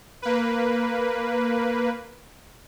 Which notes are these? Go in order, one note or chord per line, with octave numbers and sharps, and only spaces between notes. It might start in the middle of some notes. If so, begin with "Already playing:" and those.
A#3 B4